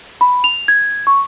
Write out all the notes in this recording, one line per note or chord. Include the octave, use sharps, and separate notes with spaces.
B5
F7
G#6
C#6